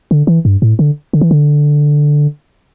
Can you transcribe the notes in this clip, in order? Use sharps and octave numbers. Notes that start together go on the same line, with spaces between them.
D3
E3
G2
A2
D3
D3
E3
D3